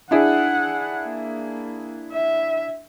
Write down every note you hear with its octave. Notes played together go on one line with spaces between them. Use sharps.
D4 E4 G#4 F#5
A#3
E5